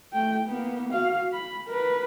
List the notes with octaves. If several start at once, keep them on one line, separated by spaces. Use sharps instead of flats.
A3 G5
A#3 B3
F#4 F5
B5
A#4 B4